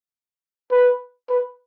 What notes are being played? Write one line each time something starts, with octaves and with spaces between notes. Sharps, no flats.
B4
B4